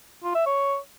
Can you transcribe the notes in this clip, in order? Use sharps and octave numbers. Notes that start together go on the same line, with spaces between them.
F4
E5
C#5